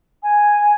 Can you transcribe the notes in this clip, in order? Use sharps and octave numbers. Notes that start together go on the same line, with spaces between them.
G#5